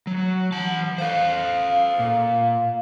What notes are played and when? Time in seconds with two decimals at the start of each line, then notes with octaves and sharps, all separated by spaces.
0.07 F#3
0.52 E3 F#5 A5
0.98 A4 C5 F5
1.99 A#2